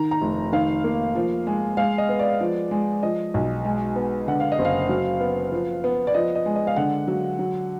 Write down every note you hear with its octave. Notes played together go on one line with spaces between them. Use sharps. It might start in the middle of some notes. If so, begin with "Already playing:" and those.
Already playing: D#3 A#5
A#5
F1
D#3 F5
A#3
F3
G#3
G#3 F5
D#5
B3
D5
F3
G#3
F3 D#5
B1
G#3
B3
D3 F#5
F5
D#5
F#1
F5
F#3
B3
F3
B3
D5
F3 D#5
D#5
G#3
D#5
F5
D3 F#5
F#3
F#3